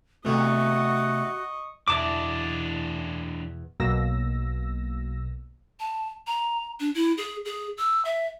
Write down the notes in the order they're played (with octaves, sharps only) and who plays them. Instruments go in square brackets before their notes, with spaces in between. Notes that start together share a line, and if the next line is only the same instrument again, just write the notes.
[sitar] G2 E3 [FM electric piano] C3 A3 B3 [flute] F#4 [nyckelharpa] D#5 C#6
[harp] E2 B2 [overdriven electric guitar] E3 D4 [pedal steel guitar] D5 A5 D6
[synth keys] B1 B2 A#3 E6 A#6
[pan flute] A5
A#5
D4
E4
G#4
G#4
E6
E5